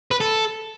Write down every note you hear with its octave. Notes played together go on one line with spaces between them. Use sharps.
B4
A4